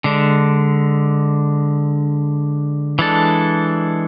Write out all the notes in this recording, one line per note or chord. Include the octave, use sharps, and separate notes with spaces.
D3 G#3 D4
E3 G#3 D4 A4